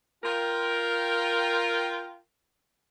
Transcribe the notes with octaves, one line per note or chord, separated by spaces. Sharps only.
F4 A#4 G5